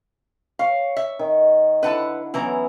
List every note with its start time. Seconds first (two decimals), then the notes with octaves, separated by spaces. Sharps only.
0.59 C#5 F5
0.97 E5
1.19 D#3
1.83 D3 E4 B4 F#5 A5
2.34 E3 F#3 B3 C#4 E4 A#5